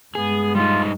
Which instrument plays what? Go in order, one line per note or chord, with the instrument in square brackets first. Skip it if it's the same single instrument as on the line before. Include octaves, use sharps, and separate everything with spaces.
[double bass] G2 G#3 [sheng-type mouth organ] B3 [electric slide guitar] G#4
[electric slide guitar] G3 D#4 [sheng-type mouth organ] F4